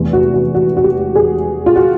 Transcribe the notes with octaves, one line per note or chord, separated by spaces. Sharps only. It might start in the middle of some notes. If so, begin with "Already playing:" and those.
Already playing: F1 E2 C3
F#4
F#4
F#4
F#4
G4
G#4
F4
F#4